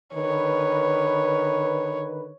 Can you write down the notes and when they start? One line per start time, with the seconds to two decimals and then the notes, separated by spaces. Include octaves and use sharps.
0.15 D3 D#3 B4 C#5